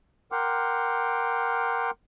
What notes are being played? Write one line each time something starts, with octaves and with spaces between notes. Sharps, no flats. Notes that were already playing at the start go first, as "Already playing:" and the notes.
A#4 F#5 G5 C6 D6 F6